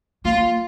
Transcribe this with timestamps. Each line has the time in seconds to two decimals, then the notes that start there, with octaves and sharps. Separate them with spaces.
0.25 A#3 F4